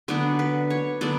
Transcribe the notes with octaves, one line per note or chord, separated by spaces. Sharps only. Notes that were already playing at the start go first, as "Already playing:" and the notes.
D3 F#3 B3 D4 D5
B4
C#5
D3 F#3 B3 D4 D5